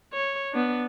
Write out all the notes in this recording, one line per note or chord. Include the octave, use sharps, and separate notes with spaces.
C#5
B3 D4